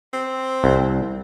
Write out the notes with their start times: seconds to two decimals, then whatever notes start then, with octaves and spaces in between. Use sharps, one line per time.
0.13 C4
0.64 C2